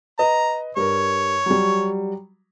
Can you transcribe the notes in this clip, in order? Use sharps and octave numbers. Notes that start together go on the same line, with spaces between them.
B4 D#5 A#5
G2 A#4 C#5
F#3 G3